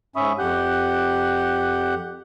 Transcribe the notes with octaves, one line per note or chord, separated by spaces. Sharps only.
G#2 C#4 E5 B5 C#6 D#6
F2 G4 F#5 F#6 G6